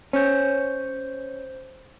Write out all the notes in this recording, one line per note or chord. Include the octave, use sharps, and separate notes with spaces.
C#4 C5 G6